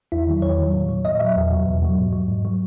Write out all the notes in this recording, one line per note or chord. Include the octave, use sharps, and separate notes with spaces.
E2 E4
D#3 F#3
E2 C#5
D#3 F#3
A#2
F#3
A#2 D#5
F#3 E5
E2
B2 F#3
E2
B2 F#3
G#2
F#3
G#2
F#3